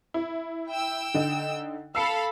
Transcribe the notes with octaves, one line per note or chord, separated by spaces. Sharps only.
E4
G5 E6
D3 D#4
A4 F5 B5 E6 C7 C#7